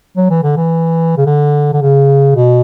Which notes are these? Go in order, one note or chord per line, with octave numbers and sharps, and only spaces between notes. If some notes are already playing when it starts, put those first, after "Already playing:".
F#3
E3
D3
E3
C#3
D3
D3
C#3
B2